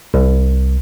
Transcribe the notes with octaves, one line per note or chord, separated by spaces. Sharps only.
C2